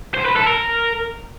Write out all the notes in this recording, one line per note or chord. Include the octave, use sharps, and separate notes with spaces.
C5
B4
A4
A#4